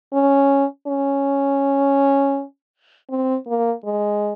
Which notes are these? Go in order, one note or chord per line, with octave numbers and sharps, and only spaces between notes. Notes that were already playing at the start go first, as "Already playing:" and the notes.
C#4
C#4
C4
A#3
G#3